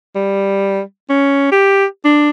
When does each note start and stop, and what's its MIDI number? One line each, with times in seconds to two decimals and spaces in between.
0.16 0.81 55
1.10 1.47 61
1.52 1.85 67
2.05 2.30 62